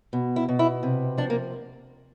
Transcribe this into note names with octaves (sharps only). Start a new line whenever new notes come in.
B2
E4
B2
E4
C3
F3 D4
A#3